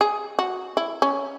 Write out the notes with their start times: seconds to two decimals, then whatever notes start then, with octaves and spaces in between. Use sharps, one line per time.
0.01 G#4
0.39 F#4
0.77 E4
1.02 C#4